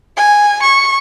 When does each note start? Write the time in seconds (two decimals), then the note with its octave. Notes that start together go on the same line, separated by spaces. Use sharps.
0.17 G#5
0.63 C#6